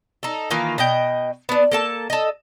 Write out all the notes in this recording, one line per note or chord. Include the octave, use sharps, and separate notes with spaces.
D#4 A4
D#3 E3 A#3 F4
B2 D#5 G5
B3 D4
A#3 A4 A5
A4 D#5